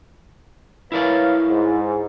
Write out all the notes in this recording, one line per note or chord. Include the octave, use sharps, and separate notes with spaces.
E4 A#4 B4 C#5 D5 F5
G#2